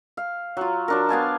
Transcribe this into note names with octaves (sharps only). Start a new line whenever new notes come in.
F5
F#3 F4
F#3 D4 A#4
B3 F5 G#5 A5